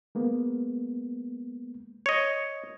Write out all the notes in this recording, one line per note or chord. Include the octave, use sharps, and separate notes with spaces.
G#3 A#3 B3
C#5 D#5